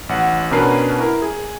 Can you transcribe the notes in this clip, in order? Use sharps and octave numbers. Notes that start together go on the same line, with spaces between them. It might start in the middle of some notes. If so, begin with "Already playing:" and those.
A1 F#5
B2 C#4 D4 A#4 B4 C7
E4 A#4
G#4